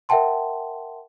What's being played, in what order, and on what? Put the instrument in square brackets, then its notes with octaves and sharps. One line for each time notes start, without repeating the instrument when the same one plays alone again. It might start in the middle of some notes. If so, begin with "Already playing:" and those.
[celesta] A#4 E5 F#5 G5 A5 C6